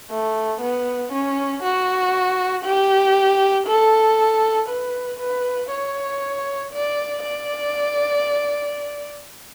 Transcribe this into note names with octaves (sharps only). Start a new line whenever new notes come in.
A3
B3
C#4
F#4
G4
A4
B4
B4
C#5
D5
D5